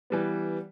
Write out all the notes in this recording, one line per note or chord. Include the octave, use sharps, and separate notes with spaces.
E3 G3 B3